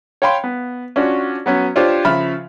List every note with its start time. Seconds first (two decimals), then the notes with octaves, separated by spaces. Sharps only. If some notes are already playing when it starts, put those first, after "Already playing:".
0.22 C#5 F5 G5 B5 C6
0.44 B3
0.96 C#4 D4 F4 F#4
1.46 F#3 B3 C#4
1.76 D4 F4 G4 C5 C#5
2.05 C#3 F3 E5 B5 F6